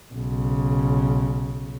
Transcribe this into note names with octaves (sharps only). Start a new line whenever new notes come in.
B1 C#3